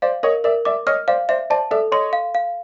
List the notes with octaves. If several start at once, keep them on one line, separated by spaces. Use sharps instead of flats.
C5 D5 F5
A#4 C#5 D#5
A#4 D5 E5
D5 E5 D6
C#5 D#5 F6
C5 D5 F5
C5 D5 E5
C5 D5 A5
A4 D5 E5
C#5 D#5 C6
F5
F5